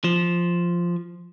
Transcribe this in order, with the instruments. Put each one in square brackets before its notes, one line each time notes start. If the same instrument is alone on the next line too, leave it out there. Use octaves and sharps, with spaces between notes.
[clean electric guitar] F3